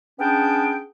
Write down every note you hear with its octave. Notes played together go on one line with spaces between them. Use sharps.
B3 C#4 D4 G#4 G5